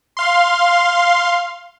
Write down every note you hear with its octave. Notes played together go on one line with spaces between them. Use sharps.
F5 C6